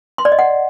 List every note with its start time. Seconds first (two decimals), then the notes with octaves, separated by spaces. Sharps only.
0.18 C6
0.25 D5
0.32 D#5
0.39 F#5